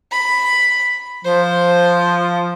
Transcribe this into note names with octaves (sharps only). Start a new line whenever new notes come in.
B5
F3 C5